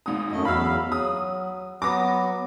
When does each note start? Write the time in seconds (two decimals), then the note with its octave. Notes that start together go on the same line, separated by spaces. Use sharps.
0.06 G#1 G#2 D#6
0.32 F#2 A3 D#5
0.45 E2 F#3 F5 B5 E6
0.92 F#3 D#6
1.82 F#3 B3 D6 D#6 A#6